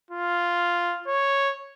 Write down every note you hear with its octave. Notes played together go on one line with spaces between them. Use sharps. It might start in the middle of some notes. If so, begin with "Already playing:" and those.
F4
C#5